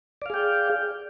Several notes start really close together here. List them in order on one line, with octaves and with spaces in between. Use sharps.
D5 F5 G#4 G5